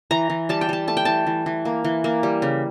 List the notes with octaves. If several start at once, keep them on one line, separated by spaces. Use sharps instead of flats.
E3 A#5
E3
G3 A5
G5
G3 A5
A3 A5
G5
E3 A5
E3
E3
A#3
E3
A#3
G3
C#3